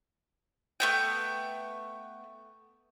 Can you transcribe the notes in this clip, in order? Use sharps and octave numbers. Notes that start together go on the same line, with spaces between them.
A3 B3 G5